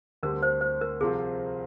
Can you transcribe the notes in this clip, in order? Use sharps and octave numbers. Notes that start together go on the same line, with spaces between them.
D2 D3 G3 C4 G4 A#4
C5
C5
A#4
C2 C3 F3 C4 F4 G#4